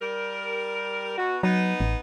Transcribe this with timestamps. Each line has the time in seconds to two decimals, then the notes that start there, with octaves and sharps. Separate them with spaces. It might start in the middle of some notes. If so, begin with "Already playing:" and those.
0.02 G3 A#4
1.18 B2 F#4
1.43 F#3 B3 D#4
1.80 A1